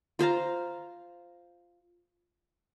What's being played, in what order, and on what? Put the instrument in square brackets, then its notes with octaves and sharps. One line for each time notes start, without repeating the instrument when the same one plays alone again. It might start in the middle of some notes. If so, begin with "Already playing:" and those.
[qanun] F4 C5 F5 A#5